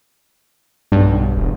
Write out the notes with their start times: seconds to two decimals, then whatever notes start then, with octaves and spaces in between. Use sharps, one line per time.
0.92 B1 G2
1.37 E1